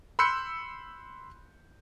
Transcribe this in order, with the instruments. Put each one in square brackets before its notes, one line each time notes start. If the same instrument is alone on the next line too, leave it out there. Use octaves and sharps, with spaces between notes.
[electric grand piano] B5 C6 E6 F#6 G6 C#7